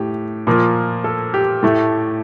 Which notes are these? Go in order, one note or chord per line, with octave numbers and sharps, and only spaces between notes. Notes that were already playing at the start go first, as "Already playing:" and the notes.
Already playing: A2 G4
A#2 F3 A#3
A4
G4
A2 A3